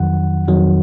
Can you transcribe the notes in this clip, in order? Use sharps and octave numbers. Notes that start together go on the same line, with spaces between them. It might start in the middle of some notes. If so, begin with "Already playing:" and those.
Already playing: F2 D#3 F#3 F#5
F2 D#3 F#3